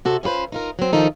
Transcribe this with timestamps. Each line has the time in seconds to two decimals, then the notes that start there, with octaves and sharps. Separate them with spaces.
0.05 C3 F#4 A4
0.23 C#4 F4 F#4 B4 C5
0.52 D#4 F4 A#4
0.79 F#3 C4
0.93 D#3 F3 D#4 A4